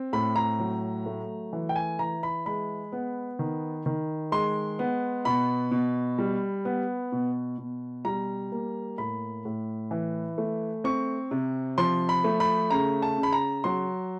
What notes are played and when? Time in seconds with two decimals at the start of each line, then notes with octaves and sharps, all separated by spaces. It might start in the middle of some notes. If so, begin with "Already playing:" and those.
Already playing: C4
0.13 A2 B5
0.36 A#5
0.59 F#3
1.06 A3
1.53 E3
1.69 G5
1.76 G#5
1.99 E3 A#5
2.23 B5
2.46 G#3 B5
2.92 B3
3.39 D#3
3.86 D#3
4.32 G#3 C6
4.79 B3
5.25 B2 B5
5.71 B2
6.19 G3
6.65 B3
7.12 B2
7.58 B2
8.05 G3 A#5
8.52 A#3
8.98 A2 B5
9.45 A2
9.91 E3
10.38 A3
10.84 C4 C#6
11.31 C3
11.78 F3 C6
12.09 B5
12.24 A3
12.40 B5
12.70 C#3 A#5
13.02 A5
13.18 C#3
13.23 B5
13.33 A#5
13.64 F#3 C6